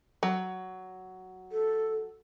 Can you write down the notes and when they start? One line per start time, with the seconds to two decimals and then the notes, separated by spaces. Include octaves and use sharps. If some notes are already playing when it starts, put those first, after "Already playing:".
0.23 F#3
1.52 A4